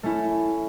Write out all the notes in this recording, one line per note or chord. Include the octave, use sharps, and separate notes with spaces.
A3 C#4 E4